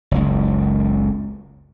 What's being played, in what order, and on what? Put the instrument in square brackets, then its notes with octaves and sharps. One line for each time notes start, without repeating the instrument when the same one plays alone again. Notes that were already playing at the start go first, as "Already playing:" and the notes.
[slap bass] F#1 C#2